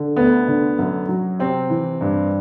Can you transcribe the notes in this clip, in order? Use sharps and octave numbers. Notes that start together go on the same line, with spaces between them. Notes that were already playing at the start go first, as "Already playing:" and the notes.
Already playing: D3
D2 B3
D3
F#2
F#3
C3 C4
E3
G2